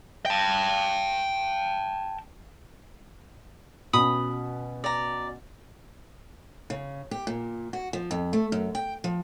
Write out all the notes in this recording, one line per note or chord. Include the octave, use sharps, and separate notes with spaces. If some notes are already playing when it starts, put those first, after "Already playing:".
G5 A5
B2 C#4 B5 D#6
D5 A#5
C#3
G4
A#2
F#4
F3
F2
A3
F#2
G5
F3